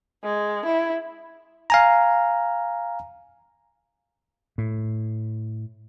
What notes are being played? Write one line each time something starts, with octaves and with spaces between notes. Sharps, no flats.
G#3
E4
F5 G#5 A#5
A2